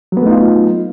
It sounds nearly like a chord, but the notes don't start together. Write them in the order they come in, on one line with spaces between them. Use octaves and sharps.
F#3 B3 A3 D#4 F4